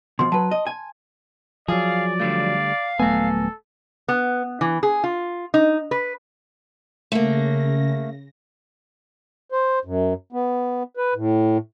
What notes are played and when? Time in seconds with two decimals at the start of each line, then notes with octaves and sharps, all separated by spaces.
0.19 B2 F3 C6
0.32 F#3 B4 A5
0.51 D#5
0.67 G#5
1.68 F3 F#3 G#4 D5 F5
2.20 D3 G3 A3 F5
2.99 D#1 F#3 A3 B3 A4 G#5
4.08 B3
4.61 E3
4.83 G#4
5.04 F4
5.54 D#4
5.91 B4
7.12 C#3 A3 A#3 A#6
9.52 C5
9.85 F#2
10.32 B3
10.97 B4
11.15 A2